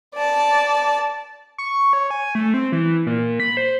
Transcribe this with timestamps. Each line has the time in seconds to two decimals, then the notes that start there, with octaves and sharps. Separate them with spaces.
0.14 D5 A5
1.58 C#6
1.93 C#5
2.11 G#5
2.35 A3
2.54 C4
2.72 E3
3.06 A#2
3.40 B5
3.57 C5